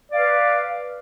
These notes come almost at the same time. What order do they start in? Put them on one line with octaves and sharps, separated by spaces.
D5 F5 B4